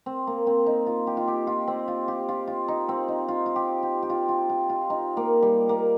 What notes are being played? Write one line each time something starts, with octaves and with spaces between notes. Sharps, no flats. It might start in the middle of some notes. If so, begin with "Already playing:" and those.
C4
A#3
C4
D#4
F4
G4
F4
G4
F4
C4
F4
G4
F4
F4
D#4
C4
D#4
F4
F4
G4
G4
G4
F4
F4
F4
F4
D#4
A#3
G3
A#3